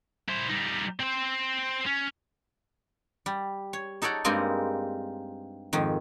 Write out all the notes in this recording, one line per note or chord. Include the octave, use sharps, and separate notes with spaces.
E4 C5
G3 D#4
C4 C5
C#4
G3
C#5
D#4 A4 C#5 D5 F#5
G2 G3 G#3 A#3 C4 D#4
F2 G#2 D#3